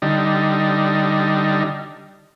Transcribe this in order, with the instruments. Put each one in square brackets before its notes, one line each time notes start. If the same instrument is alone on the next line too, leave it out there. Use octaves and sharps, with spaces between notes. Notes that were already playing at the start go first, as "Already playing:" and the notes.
[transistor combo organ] D3 G3 D#4